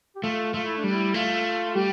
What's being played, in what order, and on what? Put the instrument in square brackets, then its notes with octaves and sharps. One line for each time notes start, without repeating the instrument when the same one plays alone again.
[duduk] G4
[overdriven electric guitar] A3 [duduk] F4
[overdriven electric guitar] A3 [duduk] F4
[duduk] E4
D4
[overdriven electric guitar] G3
[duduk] E4
[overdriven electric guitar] A3 [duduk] F4
[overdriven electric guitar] G3 [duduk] G4